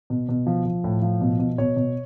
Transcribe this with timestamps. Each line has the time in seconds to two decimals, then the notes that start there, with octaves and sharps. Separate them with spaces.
0.10 B2
0.29 B2
0.47 F3
0.65 F3
0.84 A2
1.02 F3
1.21 B2
1.39 B2
1.58 B2 C#5
1.76 B2